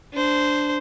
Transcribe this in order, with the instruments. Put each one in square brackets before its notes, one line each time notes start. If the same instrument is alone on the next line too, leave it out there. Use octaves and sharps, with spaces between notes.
[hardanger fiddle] D4 C5